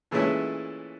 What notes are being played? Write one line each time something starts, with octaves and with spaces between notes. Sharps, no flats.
A#2 E3 G#3 A3 C#4 E4